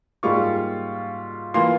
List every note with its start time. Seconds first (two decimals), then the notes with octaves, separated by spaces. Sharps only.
0.23 G#2 G3 A#3 F4 C#6
1.54 E3 A#3 F4 C6